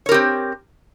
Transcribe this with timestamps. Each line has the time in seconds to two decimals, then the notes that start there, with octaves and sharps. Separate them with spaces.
0.06 C#5
0.09 A#4
0.12 G4
0.14 C4